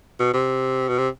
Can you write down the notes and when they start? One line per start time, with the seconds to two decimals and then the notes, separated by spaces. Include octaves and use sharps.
0.20 B2
0.34 C3
0.88 B2
0.98 C3